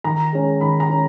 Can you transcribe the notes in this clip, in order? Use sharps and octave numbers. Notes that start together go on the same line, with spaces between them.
D#3 A#5
G#3 C#4
D#3 B5
A#5
G#3 C#4